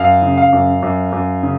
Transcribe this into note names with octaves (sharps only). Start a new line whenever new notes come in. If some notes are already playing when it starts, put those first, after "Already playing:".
Already playing: F#2 F5
C#3
F5
F#2
F#2
F#2
C#3